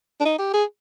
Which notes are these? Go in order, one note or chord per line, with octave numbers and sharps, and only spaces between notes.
D4
D#4
G4
G#4